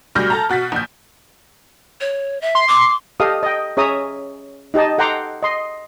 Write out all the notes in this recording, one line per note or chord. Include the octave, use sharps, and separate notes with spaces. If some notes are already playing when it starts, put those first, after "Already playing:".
D2 B2 G3 F6 G6 A#6
A4 A5 A#5
B2 F#4 A6 B6
A#1 G6
C#5
E5
C6
D6
G4 A4 D#5 F5 D#6
D#5 G5
C#4 G#4 C#5 E5 A#5 D#6
D#4 G4 D#5 A5
A4 F#5 G5 A#5 C6 D6
D#5 C6